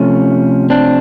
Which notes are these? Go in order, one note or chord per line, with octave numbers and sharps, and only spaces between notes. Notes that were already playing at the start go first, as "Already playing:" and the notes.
Already playing: C3 F3 A3 C#4
C4 D4